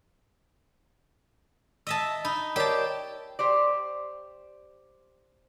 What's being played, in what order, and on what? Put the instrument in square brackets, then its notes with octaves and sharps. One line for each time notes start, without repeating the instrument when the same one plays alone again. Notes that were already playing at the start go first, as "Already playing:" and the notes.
[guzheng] D#5 E5 A5 [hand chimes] E6
[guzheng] D#4 [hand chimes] B5
[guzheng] G4 A5 [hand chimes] A#4 C#5 D5
[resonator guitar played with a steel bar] G4 C5 D5